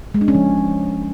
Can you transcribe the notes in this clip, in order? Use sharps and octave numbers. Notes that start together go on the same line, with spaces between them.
G#3
D4
C#4
F3